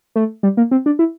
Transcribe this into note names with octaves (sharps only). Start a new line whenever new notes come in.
A3
G3
A#3
C4
D4
E4